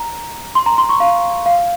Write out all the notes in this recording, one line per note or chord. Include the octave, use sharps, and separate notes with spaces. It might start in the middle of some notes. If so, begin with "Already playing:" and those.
Already playing: A#5
C6
A#5
C6
C#6
F5
F5